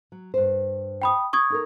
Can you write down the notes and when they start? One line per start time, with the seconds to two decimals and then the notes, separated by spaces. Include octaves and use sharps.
0.12 F#3
0.34 G2 C5
1.02 G5 B5 D#6
1.33 C#6 D#6 G#6
1.50 D#4 A4 A#4